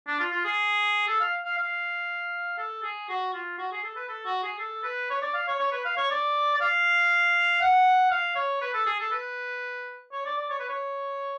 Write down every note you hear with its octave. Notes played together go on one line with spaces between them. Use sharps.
D4
F4
F4
G#4
A4
F5
F5
F5
A4
G#4
F#4
F4
F#4
G#4
A4
B4
A4
F#4
G#4
A4
B4
C#5
D5
F5
C#5
C#5
B4
F5
C#5
D5
D5
F5
F#5
F5
C#5
B4
A4
G#4
A4
B4
C#5
D5
D5
C#5
B4
C#5